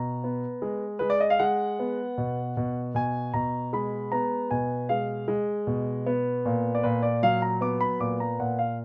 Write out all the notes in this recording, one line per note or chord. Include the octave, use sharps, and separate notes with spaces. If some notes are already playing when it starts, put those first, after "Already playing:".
Already playing: B2 A#5
B3
G#3
G#3 B4
D5
D#5
F5
G#3 F#5
B3
B2
B2
B2 G#5
B2 A#5
G#3 B5
B3 A#5
B2 G#5
G#3 F5
G#3
B2
B3
A#2
D5
A#2 B4
D5
F#3 F5
A#5
B3 D6
B5
A#2 D6
A#5
A#2 F#5
F5